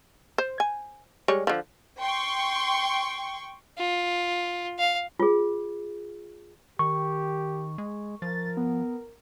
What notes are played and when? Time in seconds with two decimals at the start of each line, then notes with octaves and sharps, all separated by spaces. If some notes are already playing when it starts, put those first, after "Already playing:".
0.38 C5
0.60 G#5
1.28 G3 G#3 C#5
1.47 D3 F3
1.99 G5 C6 C#6
3.78 F4
4.79 F5
5.20 F4 G#4
6.79 D#3 G4 C#6
7.78 G#3
8.22 F3 A#4 A6
8.57 B3